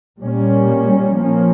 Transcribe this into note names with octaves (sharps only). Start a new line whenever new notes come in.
A#2 G3 A#3 C#4
F3 A#3 C#4